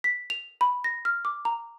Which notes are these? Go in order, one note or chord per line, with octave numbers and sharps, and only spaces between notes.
B6
F7
B5
A#6
F6
D6
A#5